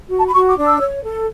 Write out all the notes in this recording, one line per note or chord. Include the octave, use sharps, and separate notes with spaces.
F#4
A5
B5
F#4 C#6
D6
D4
E6
C#5
A4